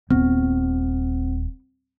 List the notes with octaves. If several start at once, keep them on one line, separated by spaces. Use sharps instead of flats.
D#1 B3 C4